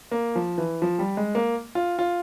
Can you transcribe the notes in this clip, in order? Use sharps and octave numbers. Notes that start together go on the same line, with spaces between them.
A#3
F3
E3
F3
G3
G#3
A#3
F4
F4